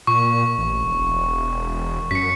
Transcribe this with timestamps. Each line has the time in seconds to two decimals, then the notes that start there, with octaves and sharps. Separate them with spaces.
0.07 A#2 C#6
0.58 A1
0.83 E1
2.11 F#2 B6 C#7